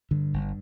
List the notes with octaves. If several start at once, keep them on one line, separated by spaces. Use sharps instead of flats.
G2 D3
G1